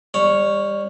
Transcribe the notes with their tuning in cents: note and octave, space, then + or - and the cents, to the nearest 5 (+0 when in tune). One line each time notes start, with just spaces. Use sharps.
G3 +30 C#5 +0